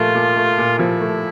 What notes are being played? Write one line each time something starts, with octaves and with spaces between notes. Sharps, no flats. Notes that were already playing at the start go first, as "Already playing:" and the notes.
Already playing: A#2 F3 A3 F4
A#2
A3
A#2
F3 E4
A3